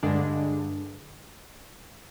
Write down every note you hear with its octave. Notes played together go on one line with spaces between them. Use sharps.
G2 D3 G#3 D4